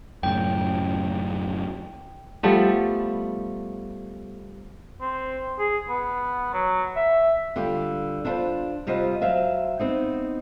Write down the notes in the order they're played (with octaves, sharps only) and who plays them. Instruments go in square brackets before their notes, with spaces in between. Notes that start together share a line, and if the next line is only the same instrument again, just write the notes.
[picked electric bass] F#2 A2 C#3 [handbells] G5
[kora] F3 G3 A3 B3
[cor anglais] C4
G#4
B3
F#3
E5
[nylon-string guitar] D3 G3 F4 G4
D4 E4 F4 G#4 B4 C5
C3 G3 F4 C5 D#5 F#5
F#3 C5 E5 F5
B3 C4 D#4